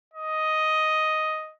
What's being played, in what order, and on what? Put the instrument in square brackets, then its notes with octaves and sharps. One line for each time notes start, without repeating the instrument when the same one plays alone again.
[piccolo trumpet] D#5